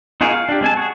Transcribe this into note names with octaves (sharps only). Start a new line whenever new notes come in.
D#4 F4 F#4 G#4 A#4
F5
D4 G4
G#3 C4 G#5 A5
F#4 G#4